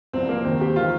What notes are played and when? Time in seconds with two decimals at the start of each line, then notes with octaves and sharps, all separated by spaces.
0.13 C2 C3 F3 C4
0.29 A#3
0.45 D#2 D#3 C4
0.61 G4
0.76 D#3 F4